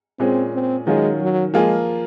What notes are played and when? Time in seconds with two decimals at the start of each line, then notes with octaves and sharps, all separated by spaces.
0.19 A#2 G#3 C4 C#4 G#4
0.53 C4
0.87 D#3 F#3 G#3 C#4 F4
1.21 F#3
1.53 F3 G#3 A#3 F4 G#4